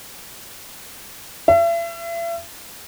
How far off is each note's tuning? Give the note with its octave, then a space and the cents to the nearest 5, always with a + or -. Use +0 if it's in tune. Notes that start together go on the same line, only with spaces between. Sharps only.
E5 +40